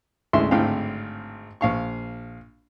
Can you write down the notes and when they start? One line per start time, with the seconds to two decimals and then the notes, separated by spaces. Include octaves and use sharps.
0.33 A1 D2 G#3 E5 C6
0.51 G#1 A2 D3 C4 F5 G5
1.61 A#1 F5 C#6